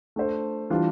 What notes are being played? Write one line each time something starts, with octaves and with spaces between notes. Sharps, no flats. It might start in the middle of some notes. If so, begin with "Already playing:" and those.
A3 D4 A4 C5
E3 G3 D4 F4